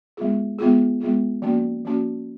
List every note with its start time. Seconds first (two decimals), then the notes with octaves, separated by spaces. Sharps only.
0.17 G#3 B3 F4 G#4
0.59 G#3 B3 F4 G#4
1.00 G#3 B3 F4 G#4
1.42 F3 A#3 C#4 F#4
1.85 F3 A#3 C#4 F#4